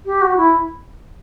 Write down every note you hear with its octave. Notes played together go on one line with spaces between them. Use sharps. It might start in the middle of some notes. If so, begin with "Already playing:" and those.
G4
F#4
E4